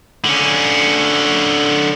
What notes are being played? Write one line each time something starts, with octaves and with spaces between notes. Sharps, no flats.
D3 C#4